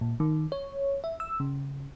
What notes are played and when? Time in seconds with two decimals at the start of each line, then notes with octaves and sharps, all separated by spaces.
0.01 A#2
0.20 D#3
0.52 C#5
1.04 E5
1.20 E6
1.40 C#3